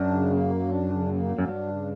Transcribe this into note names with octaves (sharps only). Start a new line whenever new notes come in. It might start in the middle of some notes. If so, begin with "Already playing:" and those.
Already playing: F#2 D4
C#3
A#3
F#3
D4
C#3
A#3
F#3
F#2
G2 D4
C#3